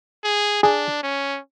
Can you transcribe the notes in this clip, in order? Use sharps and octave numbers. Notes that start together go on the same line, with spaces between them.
G#4
D4 G#4
C#4